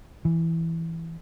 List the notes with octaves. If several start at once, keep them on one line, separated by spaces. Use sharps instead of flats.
E3